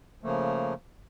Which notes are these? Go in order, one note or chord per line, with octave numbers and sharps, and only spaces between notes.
C#3 F3 A3 A#3